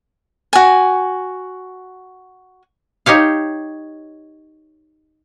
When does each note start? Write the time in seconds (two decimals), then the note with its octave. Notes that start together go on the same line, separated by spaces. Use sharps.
0.53 F#4 G#5
3.06 D#4 G4 C#5 F5